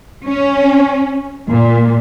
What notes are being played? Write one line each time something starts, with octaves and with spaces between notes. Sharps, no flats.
C#4
A#2